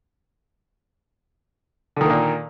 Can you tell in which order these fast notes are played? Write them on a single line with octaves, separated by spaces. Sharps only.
D3 D#3 A#3 A#2